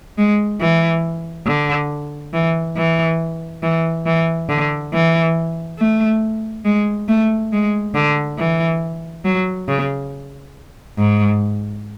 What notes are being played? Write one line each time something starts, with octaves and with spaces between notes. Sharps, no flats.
G#3
E3
D3
E3
E3
E3
E3
D3
E3
A3
G#3
A3
G#3
D3
E3
F#3
C#3
G#2